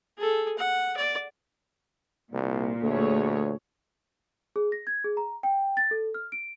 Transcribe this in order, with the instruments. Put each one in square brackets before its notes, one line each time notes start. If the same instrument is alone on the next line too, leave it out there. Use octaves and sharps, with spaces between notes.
[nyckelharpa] G#4 A4
F#5
D5
[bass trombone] C2 [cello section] A#2
[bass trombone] D2 [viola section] A3 G#4 C#5
[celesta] G#4
A#6
G#6
G#4
A#5
G5
A6
A4
F6
D7